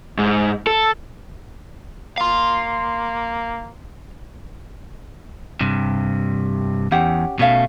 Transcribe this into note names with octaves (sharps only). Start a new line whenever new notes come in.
G#2
A4
A#3 F5 C6
G2 C3
E2 C#4 G4 F#5
B2 A3 C#4 F5